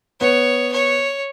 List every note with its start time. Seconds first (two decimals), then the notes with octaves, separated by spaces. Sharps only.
0.20 B3 C#5
0.73 C#5